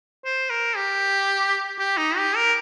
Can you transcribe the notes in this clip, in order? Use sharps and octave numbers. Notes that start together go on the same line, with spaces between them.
C5
A#4
G4
G4
D#4
G4
A#4